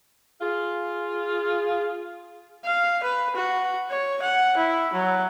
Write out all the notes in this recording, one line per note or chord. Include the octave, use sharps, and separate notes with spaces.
F4 G#4
F5
B4
F#4
C#5
F#5
E4
F#3